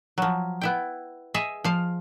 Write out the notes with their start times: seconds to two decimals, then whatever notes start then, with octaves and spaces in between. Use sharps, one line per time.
0.18 F3 F#3
0.61 B3 E4 G5
1.34 G#4 D#5 E5
1.64 F3 F5